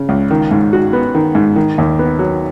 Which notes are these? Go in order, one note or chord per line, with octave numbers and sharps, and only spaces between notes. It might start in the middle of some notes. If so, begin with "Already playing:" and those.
Already playing: C#3
C#2
D#3
G#2
F#4
B3
D#3
G#2
D#3
D#2
B3
F#3